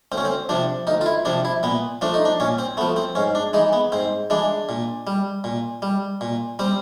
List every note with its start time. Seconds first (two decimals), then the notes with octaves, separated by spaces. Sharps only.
0.12 D2 C4
0.18 C#4
0.25 C4
0.49 C3 F3 D4
0.87 D2 D#4
1.01 F4
1.06 E4
1.25 C3 F3 D4
1.45 E4
1.63 A#2 B3
2.01 F3 A3 D4
2.14 D#4
2.25 D4
2.40 A#2 C#4
2.59 C4
2.77 A3 B3
2.81 F3
2.96 C4
3.15 G#2 C#4
3.35 D4
3.53 E3 G#3 D#4
3.73 B3
3.92 G#2 C4
4.30 E3 G#3 D4
4.69 A#2
5.07 G3
5.44 A#2
5.82 G3
6.21 A#2
6.59 G3 C4